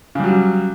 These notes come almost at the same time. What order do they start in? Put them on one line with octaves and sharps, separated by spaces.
C#3 G3 F#3